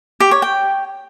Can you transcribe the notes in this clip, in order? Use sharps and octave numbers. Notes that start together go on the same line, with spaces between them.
G4
C#5
G5